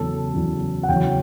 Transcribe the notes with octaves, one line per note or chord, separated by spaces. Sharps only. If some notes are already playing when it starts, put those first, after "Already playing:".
Already playing: E2 C#3 F#3 A4
E2 C#3 F#3
F#5
E2 C#3 F#3 G5